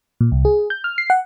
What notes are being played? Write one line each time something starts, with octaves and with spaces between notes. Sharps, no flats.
A#2
C2
G#4
G6
F6
C7
F#5